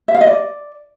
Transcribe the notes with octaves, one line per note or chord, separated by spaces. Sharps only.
E5
F5
D#5
D5